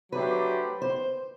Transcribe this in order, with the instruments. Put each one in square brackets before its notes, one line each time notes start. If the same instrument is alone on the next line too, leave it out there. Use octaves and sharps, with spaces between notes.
[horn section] F#3 A3 D4 G4 C5 [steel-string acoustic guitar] B4
[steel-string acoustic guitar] C5